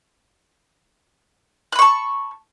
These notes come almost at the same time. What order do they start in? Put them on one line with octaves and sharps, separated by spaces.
F#6 B5 C#6 A5